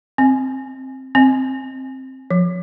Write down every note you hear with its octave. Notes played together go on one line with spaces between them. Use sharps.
C4
C4
F3